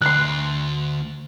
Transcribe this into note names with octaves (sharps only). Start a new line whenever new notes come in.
D2 C6 F#6